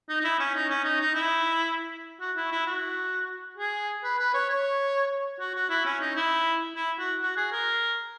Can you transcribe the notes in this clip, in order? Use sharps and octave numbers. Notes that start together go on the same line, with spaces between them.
D#4
D#4
E4
C#4
D#4
C#4
D#4
D#4
E4
F#4
E4
E4
F#4
G#4
B4
B4
C#5
C#5
F#4
F#4
E4
C#4
D#4
E4
E4
F#4
F#4
G#4
A#4